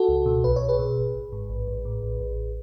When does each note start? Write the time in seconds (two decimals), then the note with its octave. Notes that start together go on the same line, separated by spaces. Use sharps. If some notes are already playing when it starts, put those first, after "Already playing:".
Already playing: F#4 A4
0.09 C#2
0.26 B2
0.44 B1 B4
0.56 C#5
0.62 B1
0.68 G#4 B4
0.79 B2
0.97 G#1
1.15 G#1
1.32 G#2
1.49 A1
1.68 A1
1.85 A2
2.03 A1
2.20 A1